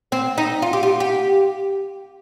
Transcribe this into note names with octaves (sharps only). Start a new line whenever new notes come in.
C4
D#4
F4
G4
F4
G4